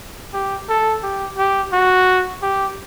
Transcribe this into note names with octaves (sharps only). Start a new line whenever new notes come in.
G4
A4
G4
G4
F#4
G4